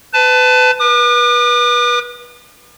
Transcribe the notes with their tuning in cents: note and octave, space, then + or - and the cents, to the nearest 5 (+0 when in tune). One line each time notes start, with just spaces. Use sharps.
B4 +30 A5 +0
B4 -30 D6 +45